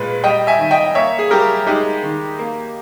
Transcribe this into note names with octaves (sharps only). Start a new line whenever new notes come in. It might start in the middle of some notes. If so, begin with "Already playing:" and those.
Already playing: A#2 G#3 B4
G3 D#5 G5
E5 G#5
D#3
D#5 G5
A#3 C#5 E5
G#4
G3 G4 A#4
G#3 D#4 G4
D#3
A#3